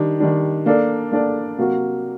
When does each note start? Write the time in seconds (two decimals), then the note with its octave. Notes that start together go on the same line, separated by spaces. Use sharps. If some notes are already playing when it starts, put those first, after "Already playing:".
Already playing: D#3 G3 D4
0.20 D#3 G3 D4
0.66 A#3 D4 A4 D5
1.12 A#3 D4 A4 D5
1.58 C3 F#3 A#3 F#4